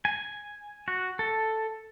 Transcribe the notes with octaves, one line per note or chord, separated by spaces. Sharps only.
G#5
F#4
A4